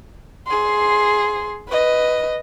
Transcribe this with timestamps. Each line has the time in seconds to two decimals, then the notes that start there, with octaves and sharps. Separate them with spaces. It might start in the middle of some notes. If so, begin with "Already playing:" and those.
0.47 G#4 C6
1.69 B4 D#5